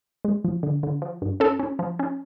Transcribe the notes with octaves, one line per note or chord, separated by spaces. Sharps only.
G#3
F3
D3
D3
F3
G2
C#4 A4
C#4
F3
C#4